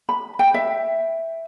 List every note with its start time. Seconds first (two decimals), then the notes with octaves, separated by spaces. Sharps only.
0.09 B5
0.39 G5
0.54 E5